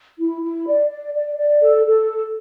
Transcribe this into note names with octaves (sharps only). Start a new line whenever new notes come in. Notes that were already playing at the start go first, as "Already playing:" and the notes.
E4
E4
D5
D5
D5
D5
A4
A4